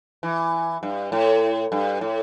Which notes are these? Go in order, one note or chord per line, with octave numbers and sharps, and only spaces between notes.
E3
G2
A2
G2
A2